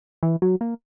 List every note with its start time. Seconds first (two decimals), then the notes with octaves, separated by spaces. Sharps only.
0.23 E3
0.42 F#3
0.61 A#3